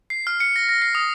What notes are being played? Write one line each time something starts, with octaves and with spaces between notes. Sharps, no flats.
C7
F6
C#7
A#6
A#6
C7
D#6